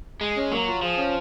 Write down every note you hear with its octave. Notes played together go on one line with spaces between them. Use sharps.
G#3 G#4
C#4
F#3 A#3
F4
F3 G#4
C#4